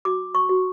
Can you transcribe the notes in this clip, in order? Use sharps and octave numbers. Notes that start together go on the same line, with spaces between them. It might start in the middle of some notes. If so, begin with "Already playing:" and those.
F#4 D6
C#6
F#4